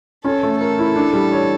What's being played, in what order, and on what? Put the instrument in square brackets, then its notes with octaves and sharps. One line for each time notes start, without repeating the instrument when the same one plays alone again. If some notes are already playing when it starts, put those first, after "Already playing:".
[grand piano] C#4 [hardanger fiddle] A4
[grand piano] A3
[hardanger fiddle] A4 [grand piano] A#4
[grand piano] E4
D4
G3
C#5